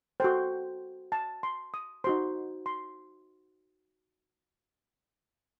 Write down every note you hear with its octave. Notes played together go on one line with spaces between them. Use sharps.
F#4 A4 C5 G5
A5
C6
D#6
D#4 F#4 C5 C6
C6